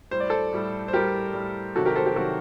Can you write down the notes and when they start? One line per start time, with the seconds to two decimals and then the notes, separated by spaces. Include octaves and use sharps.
0.11 A2 G3 C5
0.20 D5
0.29 A4 C5
0.52 A2 G3
0.88 C5
0.93 A2 G3 G4 A#4
1.34 A2 G3
1.75 C3 D#3 F#3 F#4 A4
1.86 G4 A#4
1.95 A4 C5
2.06 G4
2.16 C3 D#3 F#3 F#4 A4